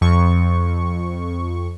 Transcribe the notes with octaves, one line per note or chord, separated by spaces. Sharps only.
F2 C#6